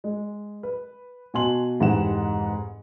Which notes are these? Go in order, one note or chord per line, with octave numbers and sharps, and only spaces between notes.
G#3
B4
B2 F#4 G#5 A5 C6 F#7
F1 G#2 E3 G4 F#5 E7